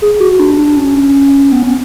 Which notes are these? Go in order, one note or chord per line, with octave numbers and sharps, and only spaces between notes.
G#4
F#4
D4
D4
C#4
B3
C#4